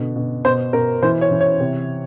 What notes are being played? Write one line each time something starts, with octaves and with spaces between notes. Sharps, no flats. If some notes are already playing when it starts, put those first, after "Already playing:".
Already playing: B2 D3
B2
B2 C5
B2 A#4
E3 C5
C#5
E3
C#5
C3